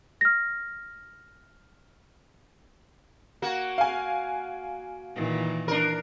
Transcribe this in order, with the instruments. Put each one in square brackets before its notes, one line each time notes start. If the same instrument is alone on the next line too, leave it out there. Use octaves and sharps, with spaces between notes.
[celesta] F6 A#6
[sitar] A#3 F#4
[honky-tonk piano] F5 G#5
[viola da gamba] A#2 D#3 E3
[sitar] D4 A#4